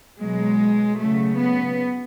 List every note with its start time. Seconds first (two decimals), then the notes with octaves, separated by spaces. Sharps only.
0.20 B2 F#3 G#3
0.99 C#3 F#3 A3
1.39 B3